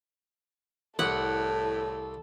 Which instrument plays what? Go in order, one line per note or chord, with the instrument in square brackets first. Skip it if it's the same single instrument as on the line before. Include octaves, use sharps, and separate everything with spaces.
[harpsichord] C2 [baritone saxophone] A2 [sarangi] A4 [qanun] F#5